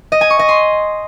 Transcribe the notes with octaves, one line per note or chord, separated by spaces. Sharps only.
D#5
G#5
C#6
D#5
C6